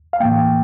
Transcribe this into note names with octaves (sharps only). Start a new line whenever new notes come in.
F5
A2 E3 A#3 G5